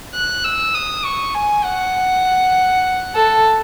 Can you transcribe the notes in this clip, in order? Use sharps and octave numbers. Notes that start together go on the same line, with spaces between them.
F#6
E6
D#6
C#6
G#5
F#5
A4